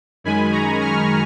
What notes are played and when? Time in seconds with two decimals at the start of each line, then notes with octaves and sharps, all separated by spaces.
0.24 F#2 D#3 G#3 G#5 B5
0.52 A#5 C#6
0.81 C#6 F6